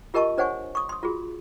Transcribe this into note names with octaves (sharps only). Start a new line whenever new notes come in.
F4 G4 A#4 D#5 A5 C#6
D4 C5 C#5 F#5 G#5 C#6
C#6 D#6
C6 D#6
F4 F#4 G#4